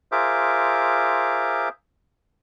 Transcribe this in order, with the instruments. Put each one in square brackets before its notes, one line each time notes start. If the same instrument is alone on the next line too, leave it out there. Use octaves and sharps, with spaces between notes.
[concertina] F4 G#4 A#4 C5 E5 D6